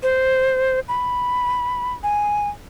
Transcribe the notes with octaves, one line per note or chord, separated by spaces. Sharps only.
C5
B5
G#5